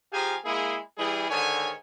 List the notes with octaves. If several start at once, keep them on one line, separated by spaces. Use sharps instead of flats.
F3 G4 G#4 F5 G#5 A#5
G#3 A#3 E4 G#4
E3 G3 E4 G#4
G#2 D3 D#3 C#5 G#5